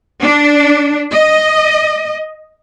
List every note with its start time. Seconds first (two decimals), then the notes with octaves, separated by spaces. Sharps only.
0.22 D4
1.10 D#5